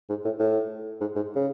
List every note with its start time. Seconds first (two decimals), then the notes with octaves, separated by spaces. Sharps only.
0.09 G#2
0.25 A2
0.40 A2
1.01 G#2
1.16 G#2
1.36 C#3